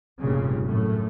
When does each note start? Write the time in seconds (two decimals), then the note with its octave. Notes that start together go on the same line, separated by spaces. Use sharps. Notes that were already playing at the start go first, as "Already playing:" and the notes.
0.20 F1 G2 A#2 C#3
0.67 F#2 A2 A3